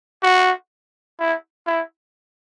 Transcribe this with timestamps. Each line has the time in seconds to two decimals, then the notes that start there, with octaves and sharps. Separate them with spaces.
0.22 F#4
1.19 E4
1.66 E4